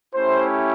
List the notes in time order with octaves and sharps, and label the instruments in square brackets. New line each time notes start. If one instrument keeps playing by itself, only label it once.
[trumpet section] A3 C#4 E4 G4 C5